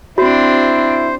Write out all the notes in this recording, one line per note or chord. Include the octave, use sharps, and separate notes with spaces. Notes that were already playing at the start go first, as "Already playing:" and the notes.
C4 D4 E4 F#4 C5